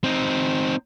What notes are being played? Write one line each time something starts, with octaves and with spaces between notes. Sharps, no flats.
C4 D#4